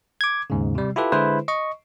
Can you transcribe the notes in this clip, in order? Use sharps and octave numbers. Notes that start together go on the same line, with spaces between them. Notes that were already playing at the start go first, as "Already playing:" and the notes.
D6 G#6
D#2 G#2 C#3
C3 G3
E4 F4 G4 A4 B4
D3 G#3 E4 G#4 B4 C5
D#5 C#6